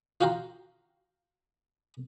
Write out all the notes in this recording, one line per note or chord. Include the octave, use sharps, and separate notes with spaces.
F4 F#4 F5 G5 A#5 C6